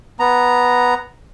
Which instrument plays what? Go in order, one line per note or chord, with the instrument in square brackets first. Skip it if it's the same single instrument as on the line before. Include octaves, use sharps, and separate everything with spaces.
[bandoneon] B3 A#5